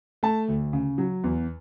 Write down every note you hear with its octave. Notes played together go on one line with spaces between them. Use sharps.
A3 A5
D2
C#3
F#3
E2